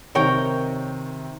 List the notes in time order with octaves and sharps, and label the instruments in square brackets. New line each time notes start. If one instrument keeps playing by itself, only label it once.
[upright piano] C3 D#3 [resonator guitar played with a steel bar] A#4 C#5 G5